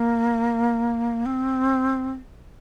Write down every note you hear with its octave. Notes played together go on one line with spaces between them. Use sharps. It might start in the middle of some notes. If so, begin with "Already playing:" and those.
Already playing: A#3
C4